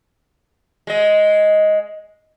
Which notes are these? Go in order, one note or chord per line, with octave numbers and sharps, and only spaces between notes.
G#3 D#5